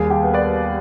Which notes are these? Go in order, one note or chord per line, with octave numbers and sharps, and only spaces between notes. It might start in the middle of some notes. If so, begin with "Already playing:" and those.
Already playing: D#2 G3 G#4
G4
B3
B4 D5